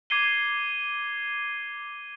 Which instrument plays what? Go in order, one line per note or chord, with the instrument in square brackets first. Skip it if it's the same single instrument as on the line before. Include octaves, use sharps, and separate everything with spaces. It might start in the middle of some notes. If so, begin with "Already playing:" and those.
[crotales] D6 G#6 C7 D#7 G7